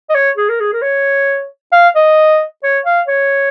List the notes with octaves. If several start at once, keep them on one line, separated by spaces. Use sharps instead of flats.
D#5
C#5
G#4
A#4
G#4
A#4
C#5
F5
D#5
C#5
F5
C#5